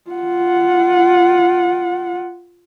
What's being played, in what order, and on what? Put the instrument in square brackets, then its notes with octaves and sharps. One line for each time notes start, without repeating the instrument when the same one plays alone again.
[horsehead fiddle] F4 F#5